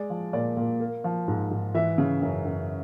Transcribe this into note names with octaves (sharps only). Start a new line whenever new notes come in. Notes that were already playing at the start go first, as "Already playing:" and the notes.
Already playing: G#3 D5
F3
A#2 D5
A#2
A#3
F3
G#2
G#2
E3 E5
C#3
F#2
F#2